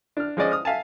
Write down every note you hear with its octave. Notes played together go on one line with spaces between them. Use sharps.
D4 F6
F3 G#3 C#4 D5 D#5
D#6 F6
E5 F5 G#5 A5